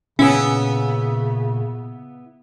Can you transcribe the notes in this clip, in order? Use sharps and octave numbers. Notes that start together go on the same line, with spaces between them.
A#2 C#3 B3 C#4 E4